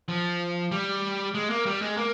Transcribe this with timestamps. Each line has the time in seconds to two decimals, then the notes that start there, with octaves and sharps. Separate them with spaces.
0.08 F3
0.71 G3
1.34 G#3
1.50 A#3
1.66 G3
1.82 G#3
1.97 A#3